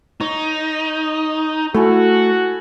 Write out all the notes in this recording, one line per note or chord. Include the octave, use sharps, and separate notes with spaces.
D#4 C#5
A3 E4 F#4 A4 G#5